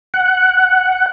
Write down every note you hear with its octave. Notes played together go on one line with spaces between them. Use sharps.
F#5